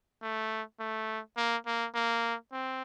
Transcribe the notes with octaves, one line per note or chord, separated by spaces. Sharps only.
A3
A3
A#3
A#3
A#3
C4